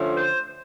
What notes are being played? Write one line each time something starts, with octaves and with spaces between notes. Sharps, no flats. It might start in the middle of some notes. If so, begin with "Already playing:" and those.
Already playing: D3 F3 A3 C#4
C5